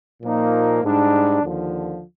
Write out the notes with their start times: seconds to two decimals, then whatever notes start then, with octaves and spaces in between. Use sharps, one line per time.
0.22 A#2 F3 A#3 D#4
0.82 G#2 G3 D4
1.42 D#2 D3 F3